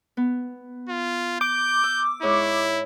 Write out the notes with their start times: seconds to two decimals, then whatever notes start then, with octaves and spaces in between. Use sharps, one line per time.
0.17 B3
0.89 F4
1.41 D6 G6
1.83 E6
2.22 G#2 E4 C#5 C#6